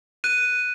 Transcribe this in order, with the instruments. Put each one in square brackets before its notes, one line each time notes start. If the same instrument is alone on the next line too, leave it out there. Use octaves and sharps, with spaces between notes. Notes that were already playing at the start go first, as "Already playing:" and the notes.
[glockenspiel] F#6 D#7